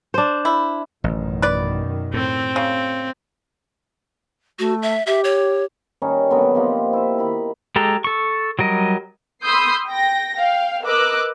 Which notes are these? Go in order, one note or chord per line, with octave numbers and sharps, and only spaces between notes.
D4 C5
E4
A1 F#2 B2 D#3
B4 D5
A2 C4
C#3
A3 F#4
E5
G4 E5
C#5
D#3 G3 C#4 D#4
B2 D3 F#3 B3
C3 F3 A#3 D#4
E4 E5
D#3 B5
G#3 G4 A4 A#5
A4 C#6
F#3 G3 A#4 D#5
B5 C6 D#6 E6 G6 C7
G5 A#6
F5 G5
A#4 B4 D#5 D6 E6 F#6